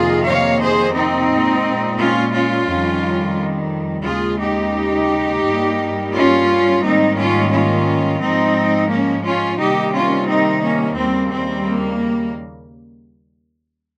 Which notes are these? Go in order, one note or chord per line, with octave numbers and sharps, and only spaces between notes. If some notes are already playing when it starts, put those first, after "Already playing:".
Already playing: F2 C3 D#3 A#3 F4 G#4
C#5 F5
G#4 C5
C4 D#4
A#2 G#3
C#4 F4
C#4 F4
F2 D#3 G3
D#2 C#3 G#3 F4 G#4
D#4 G4
G2 G3 A#3
C#4 F4
G#2 D#3 G3 A#3 C4 D#4
C#4 F4
C#4 F4
G#2 F3 G#3 C4 D#4
A#3 C#4
C#4 F4
C3 D#3 G3 A#3 D#4 G4
C#4 F4
C4 D#4
A#3 C#4
D#2 C#3 G3 A#3 C4
C4
A#3